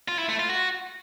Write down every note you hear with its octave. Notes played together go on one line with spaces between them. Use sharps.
F4
E4
A3
F4
F#4